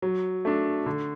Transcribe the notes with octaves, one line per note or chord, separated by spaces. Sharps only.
F#3
A3 D4
D3